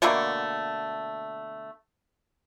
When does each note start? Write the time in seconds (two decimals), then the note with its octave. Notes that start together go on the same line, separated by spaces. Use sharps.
0.02 B2 D3 A3 A#3